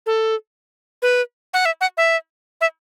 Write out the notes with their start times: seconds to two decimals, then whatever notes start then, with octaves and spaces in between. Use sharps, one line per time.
0.06 A4
1.02 B4
1.54 F#5
1.65 E5
1.81 F#5
1.97 E5
2.61 E5